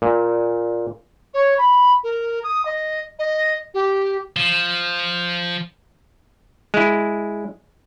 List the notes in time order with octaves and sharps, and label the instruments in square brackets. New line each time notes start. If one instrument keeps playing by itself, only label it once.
[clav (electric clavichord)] A#2
[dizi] C#5
B5
A#4
D#6
D#5
D#5
G4
[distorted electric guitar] F3
[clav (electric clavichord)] G#3 E4